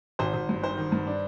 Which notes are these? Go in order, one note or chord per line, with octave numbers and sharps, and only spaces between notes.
G#1 C5
G#1
G2
D#3 C5
D#3
G2
D4